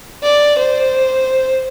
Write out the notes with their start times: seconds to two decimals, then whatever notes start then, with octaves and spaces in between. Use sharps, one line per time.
0.23 D5
0.58 C5